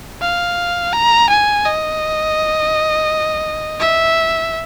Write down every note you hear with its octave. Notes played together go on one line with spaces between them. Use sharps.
F5
A#5
G#5
D#5
E5